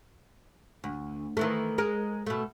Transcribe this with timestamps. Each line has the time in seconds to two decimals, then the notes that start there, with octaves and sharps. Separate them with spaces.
0.84 D2
1.37 D#3 E3 A3
1.78 G#3 A#4
2.27 B2 A3